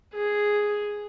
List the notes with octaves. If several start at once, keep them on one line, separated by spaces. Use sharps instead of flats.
G#4